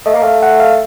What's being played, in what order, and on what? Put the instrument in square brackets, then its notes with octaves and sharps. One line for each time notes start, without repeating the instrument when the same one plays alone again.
[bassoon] A3 [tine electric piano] D#5
[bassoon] A#3
[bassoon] A3 [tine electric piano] F5
[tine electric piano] F#5
F5